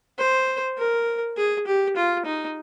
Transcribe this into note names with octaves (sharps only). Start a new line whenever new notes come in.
C5
A#4
G#4
G4
F4
D#4